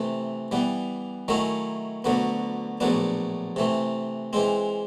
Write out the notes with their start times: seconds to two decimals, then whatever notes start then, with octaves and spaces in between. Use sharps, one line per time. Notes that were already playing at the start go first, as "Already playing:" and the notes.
Already playing: C3 E3 A3
0.51 E3 G3 B3
1.28 D#3 F#3 A3 C#4 E4
2.04 D2 D3 F#3 B3
2.80 A#1 A2 F#3 B3 D4
3.56 C3 E3 A3
4.33 E3 G#3 C4